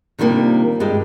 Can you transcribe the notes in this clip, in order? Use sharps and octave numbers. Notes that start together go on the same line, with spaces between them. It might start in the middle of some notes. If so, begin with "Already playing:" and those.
C3 D#3 F3 G3 A#3 D4
G2 G3 G#3 G4